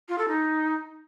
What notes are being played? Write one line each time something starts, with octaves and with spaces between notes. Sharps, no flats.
F4
A4
D#4